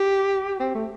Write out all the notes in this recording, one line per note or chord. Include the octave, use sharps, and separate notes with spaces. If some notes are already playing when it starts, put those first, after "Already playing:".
Already playing: G4
C4
A3